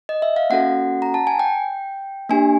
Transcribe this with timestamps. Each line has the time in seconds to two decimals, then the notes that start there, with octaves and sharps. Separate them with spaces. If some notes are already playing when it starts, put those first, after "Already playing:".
0.09 D#5
0.22 E5
0.36 F5
0.50 A#3 C#4 F#4 A4 F#5
1.02 A#5
1.14 A5
1.27 G#5
1.39 G5
2.30 A#3 D4 G4 G#5